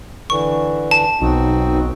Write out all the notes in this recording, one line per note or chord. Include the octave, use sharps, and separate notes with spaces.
D3 E3 C#6
A5
B1 C4 D#4 F#4